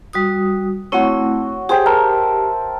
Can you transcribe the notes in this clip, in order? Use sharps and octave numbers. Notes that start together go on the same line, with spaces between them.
G3 F#4 D#6
A3 C4 E4 F#4 C#5
G4 G#4 C5 G5
A#4 E5 A5